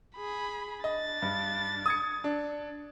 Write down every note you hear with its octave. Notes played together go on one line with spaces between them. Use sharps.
G#4 B5
D4 D#5 A6
G2
D#6 G#6 C#7
D4